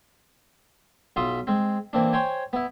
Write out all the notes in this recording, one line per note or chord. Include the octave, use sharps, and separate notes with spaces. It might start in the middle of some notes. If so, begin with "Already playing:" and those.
B1 F4 E5 C6 D#6
G#3 C4
E3 A#3 C4 D4
C5 C#5 G5 G#5
B3 E4